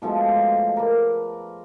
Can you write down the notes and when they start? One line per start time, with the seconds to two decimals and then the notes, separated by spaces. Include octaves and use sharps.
0.02 B2 F3 G#3 A3
0.77 A#4 B4 D5